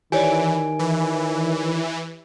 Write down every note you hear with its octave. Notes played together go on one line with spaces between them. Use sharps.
D#3 E3 G4 C#5 D5 G#5
E3